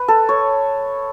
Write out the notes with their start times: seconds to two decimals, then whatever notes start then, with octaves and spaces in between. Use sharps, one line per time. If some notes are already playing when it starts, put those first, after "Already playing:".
Already playing: B4
0.08 A4
0.29 C#5